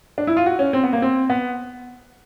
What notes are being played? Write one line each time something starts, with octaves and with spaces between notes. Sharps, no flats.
D4
E4
F4
F#4
C#4
C4
B3
A#3
C4
B3